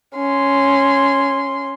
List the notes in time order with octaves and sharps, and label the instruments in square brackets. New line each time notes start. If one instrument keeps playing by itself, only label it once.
[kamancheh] C#4 C6